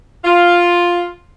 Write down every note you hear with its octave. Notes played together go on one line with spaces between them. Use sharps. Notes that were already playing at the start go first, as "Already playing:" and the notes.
F4